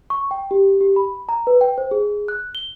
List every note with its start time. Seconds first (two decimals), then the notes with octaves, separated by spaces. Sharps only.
0.10 C#6
0.31 G5
0.51 G4
0.81 G4
0.96 B5
1.29 A#5
1.47 B4
1.61 G5
1.78 C5
1.91 G#4
2.28 F#6
2.55 G7